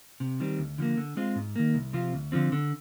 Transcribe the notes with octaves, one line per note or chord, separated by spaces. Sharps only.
C3
D#3 G3 C4
D2
D3 F3 A#3
D3
G#3 C4 F4
G#2
D#3 A#3
C2
C3 F3 C4 F4
D2
D3 F3 C4
D3